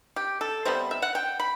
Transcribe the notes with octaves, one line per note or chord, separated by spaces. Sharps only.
G4
A4
C3 G3 B3 C5
E5
F#5
G5
B5